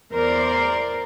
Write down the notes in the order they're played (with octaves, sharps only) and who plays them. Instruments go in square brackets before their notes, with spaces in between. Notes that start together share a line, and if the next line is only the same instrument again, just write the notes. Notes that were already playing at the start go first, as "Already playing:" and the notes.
[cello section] E2 A#4 C5 D5